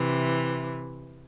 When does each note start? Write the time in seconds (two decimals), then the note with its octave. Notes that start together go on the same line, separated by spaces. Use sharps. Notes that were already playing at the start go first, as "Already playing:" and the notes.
Already playing: C3 E3